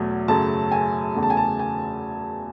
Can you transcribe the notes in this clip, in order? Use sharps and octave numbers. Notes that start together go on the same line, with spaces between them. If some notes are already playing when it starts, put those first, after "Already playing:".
Already playing: E2 B2 F#3 A3
F#2 C#3 F#3 A3 A5
G#5
E2 C#3 F#3 A3
A5
G#5
A5
G#5